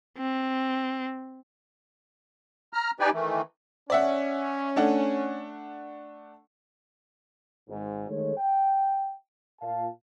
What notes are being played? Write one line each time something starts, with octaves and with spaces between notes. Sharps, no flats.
C4
A#5 F6
D#4 G4 B4 D5 G5 G#5
D#3 E3 A3
C#4 D5 E5 F#5
A3 D4 F#5
G#1 G#2
D#3 G#3 A3 A4 C#5
G5
A#2 F5 A5